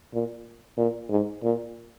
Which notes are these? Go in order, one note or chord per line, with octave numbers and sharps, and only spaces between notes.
A#2
A#2
G#2
A#2